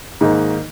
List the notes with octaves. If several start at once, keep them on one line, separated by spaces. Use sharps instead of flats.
G#2 D#3 A#3 D#4